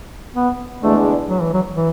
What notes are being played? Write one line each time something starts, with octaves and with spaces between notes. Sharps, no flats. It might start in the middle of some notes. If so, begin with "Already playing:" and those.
B3
E2 D3 G#3 A3 D4
F#3
E3
F#3
E3